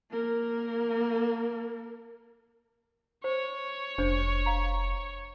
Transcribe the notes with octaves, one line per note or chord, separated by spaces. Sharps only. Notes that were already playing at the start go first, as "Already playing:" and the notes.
A#3 A#4
C5 C#5
F1 D4 C5
F5 A#5